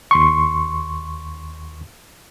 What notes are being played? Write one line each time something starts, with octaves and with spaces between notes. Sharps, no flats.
D#2 C6 C#6